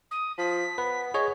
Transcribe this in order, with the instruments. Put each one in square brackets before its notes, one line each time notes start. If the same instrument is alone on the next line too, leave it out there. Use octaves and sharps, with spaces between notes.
[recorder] D#6
[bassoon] F3 [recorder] B6
[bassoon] B3 [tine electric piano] B4
[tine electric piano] G#4 C#5 D#5